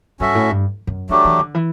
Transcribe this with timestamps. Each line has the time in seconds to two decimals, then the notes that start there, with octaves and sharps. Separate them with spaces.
0.20 G2 C#4 F#4 A4 E5
0.35 A2
0.50 G2
0.87 F#2
1.09 E3 F#3 A3 D4 G4
1.25 E3
1.39 D3
1.55 E3